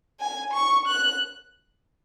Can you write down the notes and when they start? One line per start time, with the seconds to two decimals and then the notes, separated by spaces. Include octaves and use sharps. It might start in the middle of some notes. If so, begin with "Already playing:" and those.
0.20 G#5
0.54 C#6
0.88 F#6